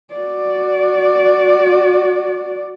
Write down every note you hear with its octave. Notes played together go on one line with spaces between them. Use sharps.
F#4 D5